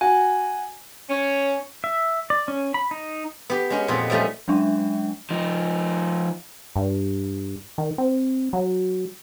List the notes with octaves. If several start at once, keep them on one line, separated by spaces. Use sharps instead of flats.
F#4 G#5
C#4
E5
D5
C#4
B5
D#4
B3 G4
G#3 C#4 G4
F2 A#2 B3 C4 C#5
F3 G3 A3 C#4 D#4
F#3 G#3 C#4 D4 E5
F3 D#4
G2
D#3
C4
F#3